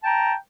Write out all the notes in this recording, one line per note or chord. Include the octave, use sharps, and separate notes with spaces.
G5 A5 A#5